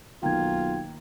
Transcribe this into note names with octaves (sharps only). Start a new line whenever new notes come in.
B1 D#3 A#3 F4 G5 G#6